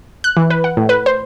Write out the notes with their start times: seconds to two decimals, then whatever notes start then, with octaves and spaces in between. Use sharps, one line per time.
0.24 F#6
0.37 E3
0.50 B4
0.64 F#5
0.77 A2
0.89 B4
1.06 C5